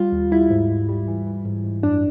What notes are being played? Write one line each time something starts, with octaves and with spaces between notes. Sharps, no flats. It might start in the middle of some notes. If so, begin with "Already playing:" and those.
Already playing: G3 F4
D#2
G3 E4
G#2
G#2
G3
E3
E3
G#2
G#2
F#2 D4